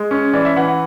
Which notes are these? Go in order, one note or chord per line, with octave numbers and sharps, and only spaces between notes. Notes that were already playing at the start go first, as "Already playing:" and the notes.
Already playing: G#3
C#4
E3 D5
E5
E3 F#5
F#5